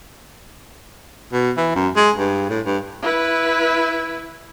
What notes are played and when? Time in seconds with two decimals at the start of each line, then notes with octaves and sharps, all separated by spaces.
1.32 B2
1.57 E3
1.75 F#2
1.96 G#3
2.17 G2
2.49 A2
2.65 G2
3.02 E4 B4